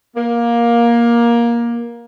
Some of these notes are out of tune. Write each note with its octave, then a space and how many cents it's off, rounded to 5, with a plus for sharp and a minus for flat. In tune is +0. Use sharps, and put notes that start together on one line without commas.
A#3 +15